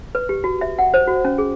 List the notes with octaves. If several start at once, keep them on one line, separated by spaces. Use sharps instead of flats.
B4
G4
F#4
E5
F#5
C5
F#4
C#4
G#4